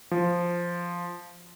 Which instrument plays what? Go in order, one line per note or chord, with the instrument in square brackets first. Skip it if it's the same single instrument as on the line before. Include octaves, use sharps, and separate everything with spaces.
[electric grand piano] F3